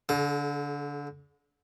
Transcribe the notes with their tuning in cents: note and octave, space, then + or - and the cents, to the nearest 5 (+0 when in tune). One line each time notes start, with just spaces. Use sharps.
D3 -25 G#4 +45